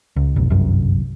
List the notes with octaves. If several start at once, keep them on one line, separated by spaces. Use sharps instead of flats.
C#2
F1 B1
G1 C2 F#2